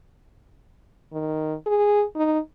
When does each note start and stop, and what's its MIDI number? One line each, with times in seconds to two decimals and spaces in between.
1.13 1.54 51
1.66 2.04 68
2.16 2.39 63